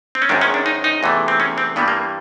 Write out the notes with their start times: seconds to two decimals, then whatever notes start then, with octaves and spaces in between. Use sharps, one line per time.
0.15 C4
0.22 C#4
0.29 G#1 F#2 D#3 G#3 D4
0.41 C#4
0.54 D4
0.66 D#4
0.84 D#4
1.03 E2 C3 E3 A3
1.28 C4
1.40 C#4
1.58 C4
1.76 G2 E3 G3 A#3 B3
1.88 A#3